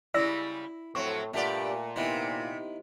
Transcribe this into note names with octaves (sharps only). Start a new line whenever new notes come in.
C#3 G3 G#3 E4 D5 E6 A#6
F2 A2 F#3 C4 C#6
G2 A#2 A3 G4 D5 F#5
C3 D#3 B3 E4